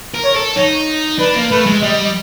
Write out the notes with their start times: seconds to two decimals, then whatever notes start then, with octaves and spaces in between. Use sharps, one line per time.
0.14 A#4
0.24 C#5
0.35 A4
0.56 D#4 C#5
1.19 D4 B4
1.35 A#3
1.51 A3 B4
1.66 G#3
1.81 G3 D#5